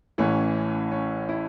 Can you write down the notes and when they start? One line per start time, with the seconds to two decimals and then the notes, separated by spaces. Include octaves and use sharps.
0.18 A1 A2 E3 C#4
0.91 C#4
1.29 E4